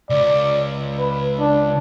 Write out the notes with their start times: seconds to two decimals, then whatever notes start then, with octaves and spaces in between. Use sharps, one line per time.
0.10 C#2 D5
1.00 B4
1.40 D4